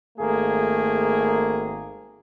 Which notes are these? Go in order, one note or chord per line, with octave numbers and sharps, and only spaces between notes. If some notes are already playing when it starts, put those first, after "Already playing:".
G#1 A3 A#3 G#4